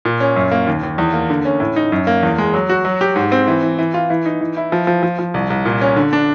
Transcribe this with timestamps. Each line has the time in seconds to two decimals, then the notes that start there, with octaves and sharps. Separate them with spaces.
0.05 A#2
0.20 C#4
0.36 F#2
0.52 A#3
0.67 D#2
0.83 D#2
0.98 E2
1.13 A#3
1.30 D3
1.45 C#4
1.60 A2
1.76 D#4
1.92 F#2
2.07 A#3
2.23 E2
2.38 G#3
2.54 F#3
2.69 F#4
2.85 F#3
3.01 G4
3.16 G#2
3.32 C4
3.47 E3
3.63 E3
3.78 E3
3.94 F4
4.10 E3
4.26 D#4
4.41 E3
4.57 E4
4.72 F3
4.87 F3
5.03 F3
5.19 F3
5.34 C2
5.50 C2
5.65 A#2
5.81 C#4
5.96 D3
6.13 D4